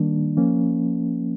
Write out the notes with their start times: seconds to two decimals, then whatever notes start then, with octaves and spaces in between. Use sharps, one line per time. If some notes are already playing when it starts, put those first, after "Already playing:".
Already playing: D#3 G3 A#3 D4
0.37 F3 A#3 C#4